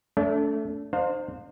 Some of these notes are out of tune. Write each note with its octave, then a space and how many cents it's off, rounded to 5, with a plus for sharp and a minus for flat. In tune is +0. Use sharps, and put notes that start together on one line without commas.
A3 +0 D4 -45
D#4 -45 C5 +0 F5 +25